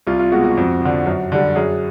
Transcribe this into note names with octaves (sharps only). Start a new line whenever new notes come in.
C2 F4
F4
B2 G#3 F#4
F#4
F2
D3 F3
F#2
D3 G3
F#2 G#4